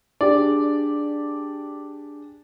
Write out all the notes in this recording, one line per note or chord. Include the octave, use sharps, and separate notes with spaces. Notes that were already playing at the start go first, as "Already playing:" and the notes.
D4 G4 G#4 D5